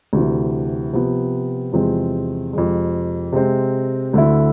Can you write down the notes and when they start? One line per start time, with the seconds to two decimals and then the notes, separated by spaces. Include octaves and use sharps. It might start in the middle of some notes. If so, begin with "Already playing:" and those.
0.13 D2 C3 E3
0.93 C3 F3 B3
1.72 E2 C3 F3 G#3 C4
2.53 F2 C3 G#3
3.33 C3 G#3 C4
4.14 D2 D3 A3 E4